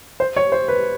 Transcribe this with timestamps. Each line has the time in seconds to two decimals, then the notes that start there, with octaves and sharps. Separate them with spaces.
0.20 C5
0.36 C#5
0.52 C5
0.68 B4